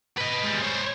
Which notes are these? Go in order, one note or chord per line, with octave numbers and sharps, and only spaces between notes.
B4 D#5
G3 G#3
C5 C#5